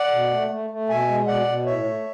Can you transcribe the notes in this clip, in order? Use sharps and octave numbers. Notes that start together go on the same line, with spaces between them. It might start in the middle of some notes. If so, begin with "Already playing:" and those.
Already playing: D5 F#5
B2
A3
A3
A3
B2 E5 G#5
G#3
B2 D5 F#5
B2
A2 C#5 E5
A3